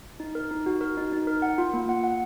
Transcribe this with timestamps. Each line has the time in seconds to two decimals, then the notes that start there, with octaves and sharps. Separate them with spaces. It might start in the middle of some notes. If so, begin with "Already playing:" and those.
0.20 D#4
0.35 A#4
0.51 D#4
0.66 F#4
0.81 A#4
0.97 D#4
1.13 D#4
1.27 A#4
1.42 F#5
1.58 F4
1.74 A#3
1.89 F#5
2.04 F#5